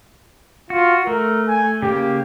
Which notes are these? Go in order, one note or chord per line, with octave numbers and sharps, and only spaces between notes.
F4 F#4
A3 A#4
G#5
C#3 A#3 G4